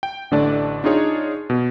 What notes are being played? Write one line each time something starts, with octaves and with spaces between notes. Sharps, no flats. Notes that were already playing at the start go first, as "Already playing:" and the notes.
G5
A1 D3 A3 D4 D5 A5
D4 D#4 F4 G#4 C#5
B2